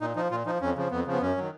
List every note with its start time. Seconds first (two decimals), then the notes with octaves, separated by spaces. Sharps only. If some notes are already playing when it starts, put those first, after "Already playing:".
0.01 A#2 D#4
0.16 F3 D#4
0.31 A#2 F4
0.46 F3 D#4
0.61 F2 C#4
0.76 C#3 F3
0.91 F2 B3
1.06 C#3 F3
1.13 B3
1.21 F#2 C#4
1.36 D#3 F#3